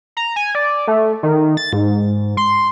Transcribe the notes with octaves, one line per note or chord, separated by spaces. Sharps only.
A#5
G#5
D5
A3
D#3
A6
G#2
C6